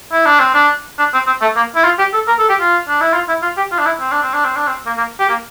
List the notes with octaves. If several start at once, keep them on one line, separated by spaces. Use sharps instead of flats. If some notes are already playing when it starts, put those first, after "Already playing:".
E4
D4
C4
D4
D4
C4
C4
A3
A#3
E4
F4
G4
A4
A#4
A4
G4
F4
D4
E4
F4
E4
F4
G4
F4
D4
E4
C4
D4
C4
D4
C4
D4
C4
A#3
A#3
G4
A#3